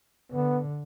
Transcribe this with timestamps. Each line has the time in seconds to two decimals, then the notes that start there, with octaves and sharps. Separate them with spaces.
0.32 D3 B3